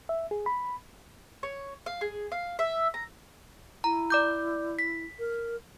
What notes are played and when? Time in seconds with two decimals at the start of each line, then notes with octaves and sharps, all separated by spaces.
0.09 E5
0.31 G#4
0.46 B5
1.43 C#5
1.86 F5
2.01 G#4
2.32 F5
2.59 E5
2.94 A#5
3.84 E4 A#5
4.10 D5 D6 G6
4.79 B6
5.19 A#4